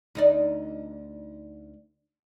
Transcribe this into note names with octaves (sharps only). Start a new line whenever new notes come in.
D2 D#4 D5